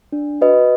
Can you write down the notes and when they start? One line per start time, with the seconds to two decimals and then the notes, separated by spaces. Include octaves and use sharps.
0.12 D4
0.41 F#4 B4 D#5